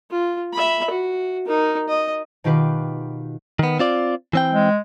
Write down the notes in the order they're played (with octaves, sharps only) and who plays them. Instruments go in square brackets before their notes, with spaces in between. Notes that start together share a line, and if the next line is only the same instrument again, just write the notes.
[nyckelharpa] F4
E5 B5
F#4
D#4 A#4
D#5
[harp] B2 D#3 F4 G4 B4
[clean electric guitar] D#3 B3
C4 F4 D5
E3 C4 G5
[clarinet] G#3